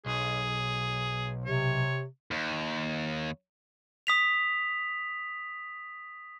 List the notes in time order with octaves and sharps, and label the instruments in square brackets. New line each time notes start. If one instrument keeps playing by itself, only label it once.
[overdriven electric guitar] B1 [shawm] G#4
[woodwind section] C3 [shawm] C#5
[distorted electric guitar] D#2
[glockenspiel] D#6 B6 F7